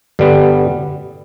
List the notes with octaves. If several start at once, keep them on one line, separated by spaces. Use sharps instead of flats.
G2 D3 G3 B3